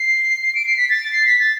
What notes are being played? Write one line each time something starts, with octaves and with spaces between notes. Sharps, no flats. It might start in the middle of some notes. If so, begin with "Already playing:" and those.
Already playing: C7
C7
D7
C7
B6
A6
C7
B6
A6